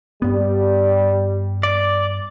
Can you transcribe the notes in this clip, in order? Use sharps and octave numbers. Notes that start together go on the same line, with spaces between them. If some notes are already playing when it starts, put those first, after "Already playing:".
G2 G3 B3
D5